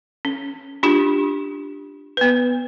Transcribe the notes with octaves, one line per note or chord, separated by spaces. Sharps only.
C#4
D4 F4 G4
B3 B4